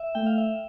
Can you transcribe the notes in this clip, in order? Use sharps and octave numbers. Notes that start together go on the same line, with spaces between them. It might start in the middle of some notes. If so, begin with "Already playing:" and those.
Already playing: E5
A3 G5
F5
E5